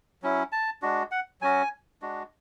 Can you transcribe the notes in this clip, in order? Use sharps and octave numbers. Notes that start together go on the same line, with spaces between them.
F#3 C#4 E4
A5
G#3 D4 F#4
F#5
F#3 C#4 F#4 G#5
G#3 D4 F#4